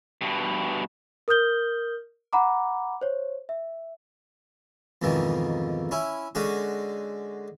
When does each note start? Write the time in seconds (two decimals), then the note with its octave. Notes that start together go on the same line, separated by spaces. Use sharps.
0.21 G2 B2
1.28 A#4 D#6 F6 G6 G7
2.33 F#5 A#5 B5 D6
3.01 C5 C#5
3.49 E5
5.02 F2 G#2 B2 D#3 E3
5.91 C#4 E4
6.35 D3 G#3 C#4 F#4